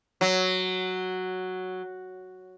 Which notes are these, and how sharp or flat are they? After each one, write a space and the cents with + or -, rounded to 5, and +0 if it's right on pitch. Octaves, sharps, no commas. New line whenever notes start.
F#3 +0